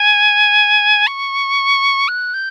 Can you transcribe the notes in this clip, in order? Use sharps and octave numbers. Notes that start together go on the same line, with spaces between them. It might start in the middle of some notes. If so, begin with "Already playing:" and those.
Already playing: G#5
C#6
F#6
G6